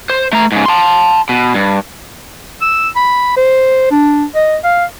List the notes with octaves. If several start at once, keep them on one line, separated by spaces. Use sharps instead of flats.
C5
A3 A#5
G#2 C#3
A5 C6
B2
G2
E6
B5
C5
D4
D#5
F5